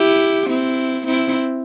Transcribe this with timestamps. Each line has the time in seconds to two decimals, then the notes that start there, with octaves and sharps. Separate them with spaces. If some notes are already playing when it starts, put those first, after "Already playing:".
Already playing: E4 G4
0.49 C4 E4
1.07 C4 E4